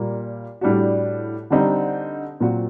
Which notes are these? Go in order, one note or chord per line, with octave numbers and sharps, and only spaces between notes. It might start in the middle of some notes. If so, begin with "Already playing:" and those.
Already playing: A#2 G3 A#3
A2 G3 D4 F#4
D3 G3 C4 D#4
A#2 F#3 C4 F#4